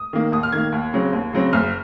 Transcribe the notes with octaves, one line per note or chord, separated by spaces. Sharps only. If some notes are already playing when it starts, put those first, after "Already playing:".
Already playing: D#6
D#3 A#3
D#2 D#6
F6
D#3 A#3 G#6
D#2
C#3 F#3 C4
D#2
C#3 F#3 C4
F#1 F6